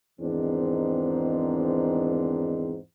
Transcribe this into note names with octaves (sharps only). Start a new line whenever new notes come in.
E2 G#2 D#3 C4 D4